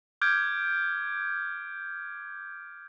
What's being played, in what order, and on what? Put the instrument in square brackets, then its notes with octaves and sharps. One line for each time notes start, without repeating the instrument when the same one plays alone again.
[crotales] D6 F6 G6 G#6 D7